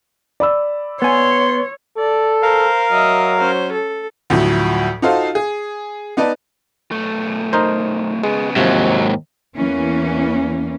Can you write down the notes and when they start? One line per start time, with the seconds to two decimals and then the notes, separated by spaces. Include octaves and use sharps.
0.40 D5 B5 E6
1.02 B3 C#5 G#5 C6
1.97 A4 D5
2.42 A#4 C5 F5
2.92 F#3 D#5 E5
3.40 C#4 C5
3.73 A4
4.30 D2 A2 F3 F#3
5.02 D#4 F4 F#4 A4 C5 F5
5.35 G#4
6.17 B3 D#4 B4 D5 A5
6.92 B1 A3
7.53 D#4 A#4 C5
8.23 C#3 G#3 B3
8.56 D#2 G#2 C3 F3 F#3
9.56 E2 E3 A#3 C#4